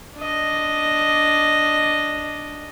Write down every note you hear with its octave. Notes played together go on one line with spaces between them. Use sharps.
D4 D#5